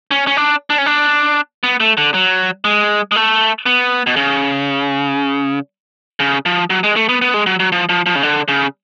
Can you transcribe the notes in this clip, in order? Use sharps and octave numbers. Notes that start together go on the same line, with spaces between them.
C#4
C#4
D4
D4
C#4
D4
B3
A3
D3
F#3
G#3
G#3
A3
B3
B2
C#3
C#3
F3
F#3
G#3
A3
B3
B3
G#3
F#3
F#3
F3
F3
F3
C#3
D3
C#3